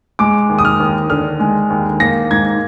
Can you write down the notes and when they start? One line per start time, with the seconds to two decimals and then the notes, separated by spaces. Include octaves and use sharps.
0.19 G#3 D6
0.49 D#2
0.58 D#6
0.65 F6
0.80 D#2
1.10 D3 F6
1.40 G#3
1.70 D#2
2.00 A#3 A#6
2.31 G#2 G#6